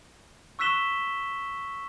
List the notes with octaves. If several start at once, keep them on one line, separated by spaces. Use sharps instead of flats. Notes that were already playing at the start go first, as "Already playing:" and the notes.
C#6 E6 F#6 B6 E7 G7